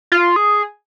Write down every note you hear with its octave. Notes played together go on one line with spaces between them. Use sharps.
F4
G#4